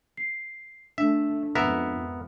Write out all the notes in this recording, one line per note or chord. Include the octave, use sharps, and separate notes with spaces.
C7
A3 D4 E5
F2 G#2 B3 A#4 E5